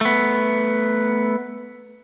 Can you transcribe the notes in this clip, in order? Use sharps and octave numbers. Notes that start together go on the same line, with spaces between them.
A3 B3